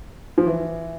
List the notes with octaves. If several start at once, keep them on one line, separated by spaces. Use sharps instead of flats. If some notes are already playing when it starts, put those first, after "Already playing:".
F3
E3